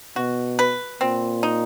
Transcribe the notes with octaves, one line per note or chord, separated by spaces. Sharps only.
B2 F#4
B4
A#2 C4
D#4